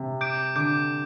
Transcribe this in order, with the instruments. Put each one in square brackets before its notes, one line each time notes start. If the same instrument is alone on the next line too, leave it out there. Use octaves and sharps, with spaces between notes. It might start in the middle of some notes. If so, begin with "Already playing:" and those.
Already playing: [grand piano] C3
[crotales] D6 G6 D7
[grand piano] D3 [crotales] D6 G6 D7